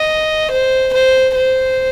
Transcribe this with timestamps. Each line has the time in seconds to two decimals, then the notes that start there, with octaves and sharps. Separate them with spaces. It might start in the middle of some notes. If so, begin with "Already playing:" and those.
Already playing: D#5
0.51 C5
0.93 C5
1.35 C5